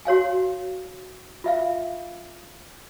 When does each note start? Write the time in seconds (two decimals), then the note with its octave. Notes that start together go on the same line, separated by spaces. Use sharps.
0.05 F#4 C#5 F5 G#5
1.44 F4 E5 F5